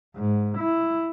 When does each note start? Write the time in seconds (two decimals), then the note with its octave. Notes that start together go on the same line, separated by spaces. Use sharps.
0.16 G#2
0.59 E4